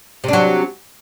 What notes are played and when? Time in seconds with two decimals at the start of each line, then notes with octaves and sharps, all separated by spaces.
0.24 C3
0.28 D4
0.33 F#3